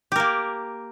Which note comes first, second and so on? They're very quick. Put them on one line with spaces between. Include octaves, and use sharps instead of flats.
G4 A#4 A#3